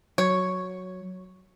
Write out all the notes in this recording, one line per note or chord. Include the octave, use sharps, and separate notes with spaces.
F#3 C#5